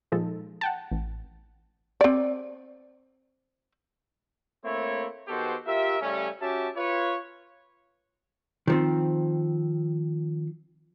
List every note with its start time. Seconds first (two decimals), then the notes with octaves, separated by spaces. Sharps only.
0.12 A#2 F3 G#3 D#4 A4
0.61 F#5 G5 A5
0.91 A1
2.01 C4 D5
4.64 A3 A#3 C4 E4 C#5
5.28 D#3 B3 F#4 G4 A4 C5
5.66 F4 G4 A#4 E5
6.00 C#3 G3 A3 C#4
6.40 C#4 F#4 G4 E5 A5
6.76 F4 B4 C#5
8.67 D#3 F3 C4